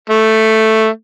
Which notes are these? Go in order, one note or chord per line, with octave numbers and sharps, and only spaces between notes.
A3